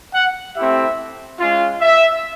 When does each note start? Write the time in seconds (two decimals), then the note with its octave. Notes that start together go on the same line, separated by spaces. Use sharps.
0.15 F#5
0.56 A3 C4 E4 G4 E5
1.40 G#3 C#4 F4
1.81 E5